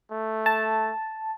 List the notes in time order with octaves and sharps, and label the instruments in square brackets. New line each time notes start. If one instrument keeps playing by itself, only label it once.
[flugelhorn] A3
[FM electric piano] A5